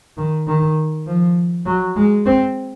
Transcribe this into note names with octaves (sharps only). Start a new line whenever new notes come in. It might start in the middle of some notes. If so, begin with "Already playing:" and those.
D#3
D#3
F3
F#3
G#3
C4